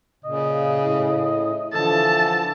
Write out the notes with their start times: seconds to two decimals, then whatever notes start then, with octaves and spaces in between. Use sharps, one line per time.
0.25 A#2 C#3 D#5
0.79 A2
1.73 D3 E3 F3 A4 A5